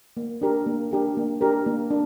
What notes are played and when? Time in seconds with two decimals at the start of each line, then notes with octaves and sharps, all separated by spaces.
0.17 A#3
0.41 D4 G4 A#4
0.66 A#3
0.91 D4 G4 A#4
1.17 A#3
1.41 D4 G4 A#4
1.66 A#3
1.91 D4